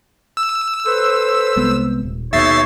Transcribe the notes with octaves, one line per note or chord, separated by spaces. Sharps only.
E6
A4 B4 C5
C2 G#3 B3
D#1
D#2 B2 D#4 G#4 C#5 E5 A6 C7